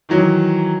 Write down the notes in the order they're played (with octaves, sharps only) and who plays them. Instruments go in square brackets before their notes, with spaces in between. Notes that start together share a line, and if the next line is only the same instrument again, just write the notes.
[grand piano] D#3 E3 F#3